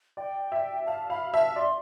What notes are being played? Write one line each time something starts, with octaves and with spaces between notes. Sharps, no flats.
D5 G5
E5
F5 A5
F5 B5
E5 A5
D5 C6